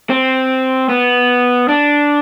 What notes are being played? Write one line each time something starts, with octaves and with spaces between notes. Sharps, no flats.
C4
B3
D4